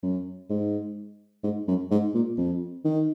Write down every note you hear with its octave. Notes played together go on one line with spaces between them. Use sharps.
F#2
G#2
G#2
F#2
G#2
A#2
F2
D#3